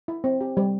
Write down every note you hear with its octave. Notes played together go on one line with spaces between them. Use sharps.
E4
C4
G4
G3